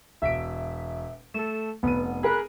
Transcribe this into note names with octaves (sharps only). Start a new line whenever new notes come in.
E1 E5 B6 D7
A3 A4 E7
F1 B3 D#7
G#4 A#4 B5 F#6